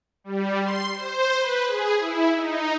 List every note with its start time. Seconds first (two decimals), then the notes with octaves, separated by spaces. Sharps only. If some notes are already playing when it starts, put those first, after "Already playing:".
0.24 G3
0.63 C6
0.95 C5
1.37 B4
1.67 G#4
1.99 E4
2.35 D#4